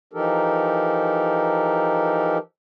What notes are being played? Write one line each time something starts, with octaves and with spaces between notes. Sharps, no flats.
E3 F3 D#4 G4 A4 A#4